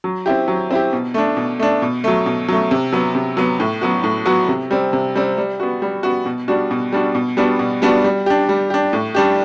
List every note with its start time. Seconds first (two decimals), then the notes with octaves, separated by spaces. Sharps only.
0.04 F#3
0.26 C4 E4 G4
0.48 F#3
0.70 C4 E4 G4
0.93 B2
1.14 A3 D4
1.37 B2
1.59 A3 D4
1.82 B2
2.04 F#3 A3
2.26 B2
2.48 F#3 A3
2.71 C3
2.92 F#3 B3
3.15 C3
3.37 F#3 B3
3.60 A2
3.81 F#3 B3 F#4
4.04 A2
4.25 F#3 B3 F#4
4.48 C3
4.71 G3 C4
4.93 C3
5.15 G3 C4
5.38 G3
5.60 B3 F#4
5.82 G3
6.03 B3 F#4
6.26 B2
6.48 G3 D4 F#4
6.71 B2
6.92 G3 D4 F#4
7.15 B2
7.37 G3 B3 D4 F#4
7.59 B2
7.82 G3 B3 D4 F#4
8.04 G3
8.26 D4 G4
8.49 G3
8.70 D4 G4
8.93 A2
9.15 G3 D4 G4